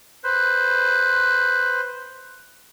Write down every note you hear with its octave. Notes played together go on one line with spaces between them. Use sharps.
B4 C5